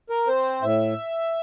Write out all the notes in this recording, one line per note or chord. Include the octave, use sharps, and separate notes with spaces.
A#4
C4 C5
A2 E5